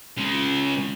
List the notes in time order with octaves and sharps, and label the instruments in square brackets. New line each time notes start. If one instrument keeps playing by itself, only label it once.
[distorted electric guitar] C#3 G#3